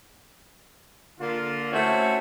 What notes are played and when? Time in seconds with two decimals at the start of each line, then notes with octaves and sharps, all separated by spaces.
1.20 D3 A#3 F4
1.72 A3 C#4 E4 F#4 C5 C#5